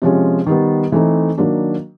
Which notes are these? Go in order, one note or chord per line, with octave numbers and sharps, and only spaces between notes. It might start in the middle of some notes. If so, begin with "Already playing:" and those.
C3 F3 G#3 C#4
D#3 G3 B3
E3 A3 C4 D#4
D#3 F#3 A#3 D4